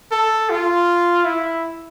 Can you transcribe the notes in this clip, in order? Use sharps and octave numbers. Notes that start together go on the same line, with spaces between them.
A4
F4
E4